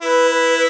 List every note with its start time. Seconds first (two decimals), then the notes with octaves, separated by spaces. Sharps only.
0.02 E4 B4
0.30 B4